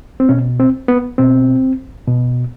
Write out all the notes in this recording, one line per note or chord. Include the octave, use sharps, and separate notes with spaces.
C4
B2 C#4
C4
B3
B2 C4
B2